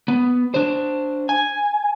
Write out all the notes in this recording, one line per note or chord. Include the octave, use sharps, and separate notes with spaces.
B3
D4 C5
G#5